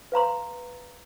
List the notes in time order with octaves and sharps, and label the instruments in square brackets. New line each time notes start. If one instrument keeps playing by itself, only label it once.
[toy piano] B4 F5 A#5 C6